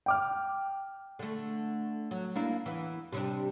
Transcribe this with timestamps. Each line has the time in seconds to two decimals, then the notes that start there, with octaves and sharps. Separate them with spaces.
0.06 G5 D6 F6
1.19 D3 A3
2.11 F#3
2.36 A#3 D4 E4
2.66 E2 E3
3.12 C3 G3 D4